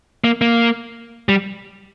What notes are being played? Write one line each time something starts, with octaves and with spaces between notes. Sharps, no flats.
A#3
A#3
G3